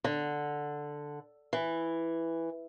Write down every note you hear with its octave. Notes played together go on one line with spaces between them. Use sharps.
D3
E3